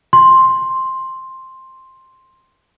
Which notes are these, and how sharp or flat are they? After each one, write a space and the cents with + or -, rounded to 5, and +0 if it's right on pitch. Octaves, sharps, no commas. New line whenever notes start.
C6 +5